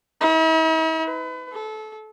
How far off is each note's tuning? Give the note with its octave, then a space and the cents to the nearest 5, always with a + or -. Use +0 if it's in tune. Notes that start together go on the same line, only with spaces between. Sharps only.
E4 -45
B4 +30
A4 -25